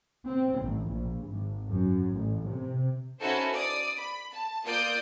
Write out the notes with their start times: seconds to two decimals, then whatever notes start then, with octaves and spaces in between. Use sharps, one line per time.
0.29 C4
0.60 A1
0.90 A#1
1.28 G#1
1.70 F#2
2.17 A1
2.50 C3
3.19 C#4 D#4 E4 F#4 A4 C5
3.53 D5 D#6
3.98 B5
4.33 A5
4.64 A#3 F4 D5 D#6 G6 D7